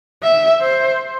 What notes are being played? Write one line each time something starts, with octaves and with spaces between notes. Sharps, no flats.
E5
C5